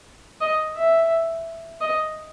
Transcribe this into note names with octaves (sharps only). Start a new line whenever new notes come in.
D#5
E5
D#5